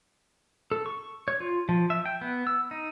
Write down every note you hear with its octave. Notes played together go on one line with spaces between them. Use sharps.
A4
C#6
C#5
F4
F3
E5
G5
B3
E6
D#4